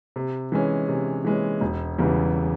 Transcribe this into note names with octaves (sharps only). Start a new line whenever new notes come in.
C3
E3 G#3 C#4
C3
E3 G#3 C#4
E1
E2 C#3 E3 G3